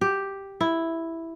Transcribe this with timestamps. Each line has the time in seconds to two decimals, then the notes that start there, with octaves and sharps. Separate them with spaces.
0.01 G4
0.61 E4